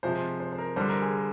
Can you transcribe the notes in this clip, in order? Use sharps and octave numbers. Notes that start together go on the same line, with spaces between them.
C3 F3 G#3 C5
C5
C5
A#4
D3 G3 C5
A#4
G#4
A#4